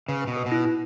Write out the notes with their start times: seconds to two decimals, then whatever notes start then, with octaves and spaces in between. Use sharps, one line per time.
0.08 C#3 B4
0.22 B4
0.27 B2
0.37 B4
0.46 B2
0.52 E4
0.65 E4